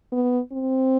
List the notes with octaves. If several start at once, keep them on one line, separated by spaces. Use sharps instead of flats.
B3
C4